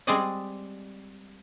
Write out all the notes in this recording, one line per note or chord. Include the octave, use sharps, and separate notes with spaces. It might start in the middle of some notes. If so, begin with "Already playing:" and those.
G3 G#3 C4 G#4 D5 D#5